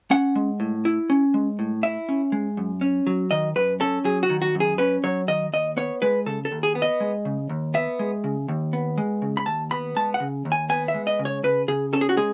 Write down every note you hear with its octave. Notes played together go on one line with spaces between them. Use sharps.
C#4 F#5
G#3
A2
E4
C#4
G#3
A2
E4 E5
C#4
G#3
F#2
C#4
F#3
D#3 D#5
F#2 B4
C#4 A4
F#3 G#4
F#4
D#3
F#4
F#2
G#4
C#4 B4
F#3 C#5
D#3 D#5
D#2 D#5
B3 C#5
G#3 B4
C#3 A4
A4
D#2
G#4
B3
D#5
G#3
C#3
D#2
B3 E5
G#3
C#3
D#2
B3
G#3
C#3
B5
D#2 A5
B3 B5
G#3 A5
F#5
C#3
D#2
G#5
B3 G#5
E5
G#3
D#5
C#3
C#5
C#3 B4
C#3 G#4
C#4 A4
G#4
F#4
G#3 G#4